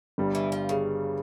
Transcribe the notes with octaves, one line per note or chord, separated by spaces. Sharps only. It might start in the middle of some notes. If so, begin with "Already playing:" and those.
G1 G2 G3
E3
F3
C#3